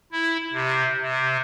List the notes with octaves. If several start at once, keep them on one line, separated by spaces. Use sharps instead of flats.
E4
C3
C3